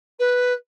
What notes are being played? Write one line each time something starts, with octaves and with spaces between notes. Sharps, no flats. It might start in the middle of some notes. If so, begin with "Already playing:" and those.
B4